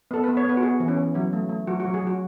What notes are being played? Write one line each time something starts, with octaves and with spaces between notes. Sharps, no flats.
B3 A4
B4
B3
C#5
B3 B4
F#4
B3 G#4
E3
C#4
E3
F#3 E4
A3
A3
F#3 F#4
F#4
F#3
G#4
F#3 F#4